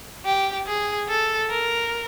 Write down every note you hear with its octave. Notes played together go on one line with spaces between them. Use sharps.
G4
G#4
A4
A#4